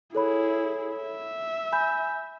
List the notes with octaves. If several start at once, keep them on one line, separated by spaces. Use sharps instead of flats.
E4 G#4 A4 C#5 B5
E5
G#5 B5 G6